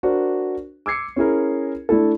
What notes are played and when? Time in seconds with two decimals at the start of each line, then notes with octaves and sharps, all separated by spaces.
0.03 D4 F#4 A#4 C5
0.86 D6 E6 G#6 C7 C#7
1.16 C#4 E4 G#4 A#4
1.89 A3 D4 E4 A4